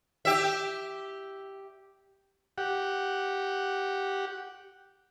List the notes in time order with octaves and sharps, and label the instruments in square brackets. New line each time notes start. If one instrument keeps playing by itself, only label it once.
[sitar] G4 E5
[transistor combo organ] G4 F#5